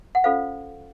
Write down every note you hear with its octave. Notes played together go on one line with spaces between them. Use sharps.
F#5
C#4 F4 A4 C5 F5